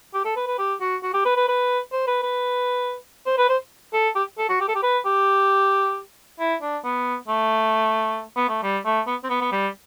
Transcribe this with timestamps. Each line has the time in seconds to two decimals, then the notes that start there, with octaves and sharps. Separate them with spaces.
0.14 G4
0.25 A4
0.36 B4
0.47 B4
0.58 G4
0.81 F#4
1.03 F#4
1.14 G4
1.25 B4
1.37 B4
1.48 B4
1.92 C5
2.07 B4
2.23 B4
3.26 C5
3.38 B4
3.49 C5
3.93 A4
4.15 G4
4.38 A4
4.49 F#4
4.61 G4
4.68 A4
4.75 G4
4.83 B4
5.05 G4
6.39 E4
6.62 D4
6.84 B3
7.28 A3
8.37 B3
8.49 A3
8.63 G3
8.85 A3
9.07 B3
9.24 C4
9.30 B3
9.41 B3
9.52 G3